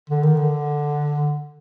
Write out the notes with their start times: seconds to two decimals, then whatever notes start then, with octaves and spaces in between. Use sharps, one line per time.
0.10 D3
0.23 D#3
0.37 D3